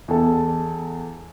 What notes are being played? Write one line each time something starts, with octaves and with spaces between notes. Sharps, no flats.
E2 A4